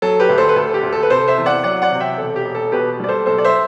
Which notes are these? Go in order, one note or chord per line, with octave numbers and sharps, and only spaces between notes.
F#3 A4
G4 B4
D2
A4 C5
B4
D2 A4
G4
D2
A4
B4
C3 A4 C5
C5 E5
E2
D5 F#5
F#3 D5 F#5
D5 F#5
C3
E5 G5
E1 A4
G4
E1
A4
B2 G4 B4
G3 D5
A4 C5
B1 A4 C5
D5
C5 E5